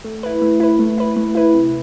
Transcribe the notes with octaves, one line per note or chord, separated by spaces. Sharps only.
A3
E4 B4
A3
E4 B4
A3
E4 B4
A3
E4 B4
C3